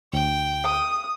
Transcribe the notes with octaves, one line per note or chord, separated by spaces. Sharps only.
D2 G5
D#6